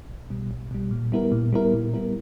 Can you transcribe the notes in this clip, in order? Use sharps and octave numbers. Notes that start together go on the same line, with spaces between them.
B1
B2 G3
B1
B2 G3
A#2
G3 B3 E4 A#4
A#2
G3 B3 E4 A#4
A#2
G3 B3 E4 A#4